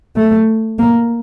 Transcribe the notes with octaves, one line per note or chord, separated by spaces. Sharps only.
A3
A#3